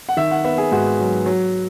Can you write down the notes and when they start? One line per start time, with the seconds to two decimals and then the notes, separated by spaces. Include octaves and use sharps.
0.09 F#5
0.17 D#3 E5
0.31 F#5
0.44 B3 E5
0.58 G#4
0.72 G#2 F#4
1.00 F#3
1.26 F#3